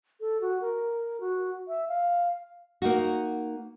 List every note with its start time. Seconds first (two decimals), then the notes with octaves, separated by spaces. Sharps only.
0.21 A4
0.41 F#4
0.61 A#4
1.20 F#4
1.68 E5
1.89 F5
2.82 A#3 D#4 F#4